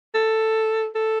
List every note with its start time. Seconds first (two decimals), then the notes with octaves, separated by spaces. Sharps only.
0.14 A4
0.95 A4